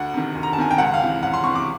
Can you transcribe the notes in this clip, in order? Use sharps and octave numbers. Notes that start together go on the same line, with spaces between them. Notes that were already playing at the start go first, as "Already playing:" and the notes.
Already playing: D2 F#5
C3 D#3
D2
A#5
A5
C3 D#3 G#5
G5
C#2 F#5
F5
C3 E3
C#2 F#5
C6
C3 C#6
E3
D6